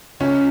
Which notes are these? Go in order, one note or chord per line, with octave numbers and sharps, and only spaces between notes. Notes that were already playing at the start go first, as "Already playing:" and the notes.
C#2 C#4